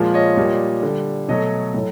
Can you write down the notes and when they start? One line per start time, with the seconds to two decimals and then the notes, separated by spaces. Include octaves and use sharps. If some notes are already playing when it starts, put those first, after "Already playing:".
Already playing: A#2 F3 G#3
0.14 C#5 D#5
0.37 A#2 G3
0.83 D3 G3
1.29 B2 F#3 A3 C#5 D#5
1.74 A2 F#3 A3